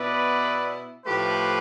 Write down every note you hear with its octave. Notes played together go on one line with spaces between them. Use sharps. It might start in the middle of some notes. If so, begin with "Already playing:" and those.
Already playing: B2 B3 E4 B4 D5
A2 F3 A3 G4 B4